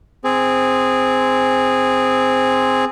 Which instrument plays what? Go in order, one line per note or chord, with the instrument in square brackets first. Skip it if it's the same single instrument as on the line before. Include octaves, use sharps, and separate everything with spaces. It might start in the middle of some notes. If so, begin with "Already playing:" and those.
[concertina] C4 G#4